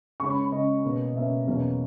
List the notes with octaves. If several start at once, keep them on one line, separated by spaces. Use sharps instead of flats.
C#3 G#3 C#4 C#6
B5
B5
C#3 G#3 C#4 D#5
B2 A#3 C#4
B2 A#3 C#4 E5
E2 B2 F#3 A#3 C#4